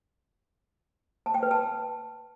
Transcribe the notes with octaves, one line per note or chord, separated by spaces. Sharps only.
A5
G5
B4
A5